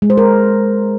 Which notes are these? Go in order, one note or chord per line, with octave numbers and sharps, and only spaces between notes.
G#3
C5
A#4